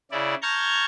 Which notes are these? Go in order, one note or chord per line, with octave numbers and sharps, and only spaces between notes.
C#3 E4 D5
A5 A#5 C#6 F6 G6 G#6